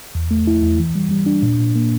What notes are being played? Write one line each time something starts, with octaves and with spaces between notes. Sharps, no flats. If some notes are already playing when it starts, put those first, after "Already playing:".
E2
A3
E4
E2
E3
G3
G3
D4
A#2
A#2
A#3